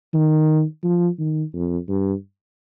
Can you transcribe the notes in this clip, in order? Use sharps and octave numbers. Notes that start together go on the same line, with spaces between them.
D#3
F3
D#3
F2
G2